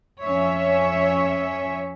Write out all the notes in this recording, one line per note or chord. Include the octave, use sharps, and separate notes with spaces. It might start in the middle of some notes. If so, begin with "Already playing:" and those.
F2 C#4 C#5 E5